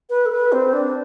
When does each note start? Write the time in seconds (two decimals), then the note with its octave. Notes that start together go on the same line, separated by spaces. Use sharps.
0.10 B4
0.26 A4
0.31 B4
0.52 C4
0.73 D4